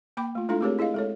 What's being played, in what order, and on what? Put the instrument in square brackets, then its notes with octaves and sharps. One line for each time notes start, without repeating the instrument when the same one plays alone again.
[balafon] A#3 G5 B5 D6
A3 F4
G#3 D4 E4 F4 A4 F5
A3 C4 G4 G#4 A#4 C#5
E4 G#4 D#5 F5
G#3 A4 C#5